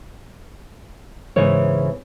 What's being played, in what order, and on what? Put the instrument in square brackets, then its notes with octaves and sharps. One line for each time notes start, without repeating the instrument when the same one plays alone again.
[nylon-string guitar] G#2 C#3 E3 B3 C#5